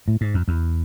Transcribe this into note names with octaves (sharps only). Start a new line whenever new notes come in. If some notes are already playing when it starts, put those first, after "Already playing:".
A2
G#2
F2
E2